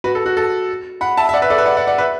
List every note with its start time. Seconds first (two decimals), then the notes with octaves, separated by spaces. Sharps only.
0.04 F#4 B4
0.15 A4
0.26 F#4
0.37 A4
1.01 F#5 B5
1.17 E5 A5
1.29 E5
1.34 D5 F#5
1.42 B4 E5
1.50 A4 D5
1.58 B4 E5
1.66 D5 F#5
1.77 D5 F#5
1.87 D5 F#5
1.98 B4 E5